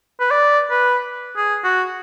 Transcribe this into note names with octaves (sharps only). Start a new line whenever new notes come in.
B4
D5
B4
G#4
F#4